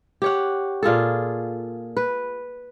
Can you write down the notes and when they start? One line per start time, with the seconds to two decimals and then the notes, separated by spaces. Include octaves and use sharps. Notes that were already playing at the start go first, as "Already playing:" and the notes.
0.22 G4 C#5 F#5
0.83 A#2 F4 G#4 A4
1.97 B4